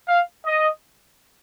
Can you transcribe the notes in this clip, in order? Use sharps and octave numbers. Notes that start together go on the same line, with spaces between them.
F5
D#5